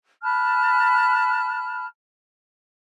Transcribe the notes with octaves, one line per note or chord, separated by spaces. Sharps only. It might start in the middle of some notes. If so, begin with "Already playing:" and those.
A5 B5 F6 F#6